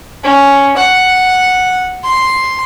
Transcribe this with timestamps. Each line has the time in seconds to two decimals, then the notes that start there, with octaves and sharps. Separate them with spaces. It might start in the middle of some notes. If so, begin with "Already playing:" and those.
0.24 C#4
0.77 F#5
2.04 C6